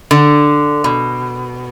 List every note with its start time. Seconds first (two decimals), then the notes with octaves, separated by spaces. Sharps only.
0.11 D3
0.84 B2